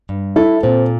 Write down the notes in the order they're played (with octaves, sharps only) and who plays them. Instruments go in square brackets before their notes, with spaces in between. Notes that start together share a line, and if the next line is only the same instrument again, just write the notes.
[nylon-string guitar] G2
[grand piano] E4 [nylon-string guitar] A4
[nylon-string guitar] A#2 [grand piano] C4